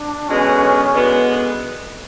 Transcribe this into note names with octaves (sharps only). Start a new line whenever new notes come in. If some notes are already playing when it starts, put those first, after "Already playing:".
Already playing: D4
F#2 D3 G#3 B3 C#4
F#2 D3 G#3 B3